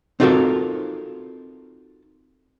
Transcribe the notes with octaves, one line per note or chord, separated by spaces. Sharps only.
C4 D#4 F4 F#4 A4 A#4